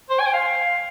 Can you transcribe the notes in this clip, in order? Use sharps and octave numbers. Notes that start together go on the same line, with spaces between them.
C5
G#5
G5
F5